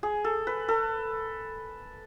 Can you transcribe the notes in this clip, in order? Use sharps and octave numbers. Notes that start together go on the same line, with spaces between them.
G#4
A4
B4
A4